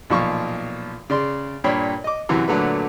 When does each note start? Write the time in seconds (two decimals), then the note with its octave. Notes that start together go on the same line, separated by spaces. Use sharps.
0.10 B1 A#2 F3 F5 C#6
1.10 C#3 D5 C6
1.64 G2 A#2 C#5 G5 B5
2.04 D#5 D6
2.29 F#2 C3 E3 F#3
2.48 A#2 D3 F#3 A3 B4